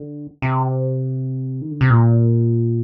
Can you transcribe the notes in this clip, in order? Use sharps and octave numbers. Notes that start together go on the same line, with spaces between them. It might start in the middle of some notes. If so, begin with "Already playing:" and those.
Already playing: D3
C3
D#3
D3
C3
A#2